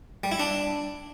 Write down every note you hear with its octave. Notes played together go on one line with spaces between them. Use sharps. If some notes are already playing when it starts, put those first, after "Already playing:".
G3
E4
D4